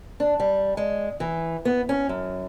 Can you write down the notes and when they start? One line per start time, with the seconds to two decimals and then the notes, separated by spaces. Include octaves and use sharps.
0.20 D4
0.40 G3
0.77 G#3
1.20 E3
1.65 B3
1.89 C#4
2.09 F#2